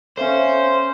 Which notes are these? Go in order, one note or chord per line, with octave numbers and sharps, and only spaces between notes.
C#4 A4 C5 E5 F5